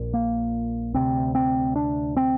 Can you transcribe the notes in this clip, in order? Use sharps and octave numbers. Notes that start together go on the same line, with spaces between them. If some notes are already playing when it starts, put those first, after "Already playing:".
Already playing: A#1 A#2
A#3
D2 C3 C4
C4
D4
C4